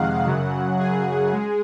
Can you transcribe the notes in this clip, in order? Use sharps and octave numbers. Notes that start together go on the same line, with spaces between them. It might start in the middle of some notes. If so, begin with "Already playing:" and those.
Already playing: F2 C3 D#3 G#3 F5 F#5
F#2 C#3 F#3
G#4
G#3